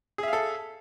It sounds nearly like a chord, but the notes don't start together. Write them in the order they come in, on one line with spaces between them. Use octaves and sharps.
G#4 E5 F5 A4